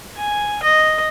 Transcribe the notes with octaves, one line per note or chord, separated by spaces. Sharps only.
G#5
D#5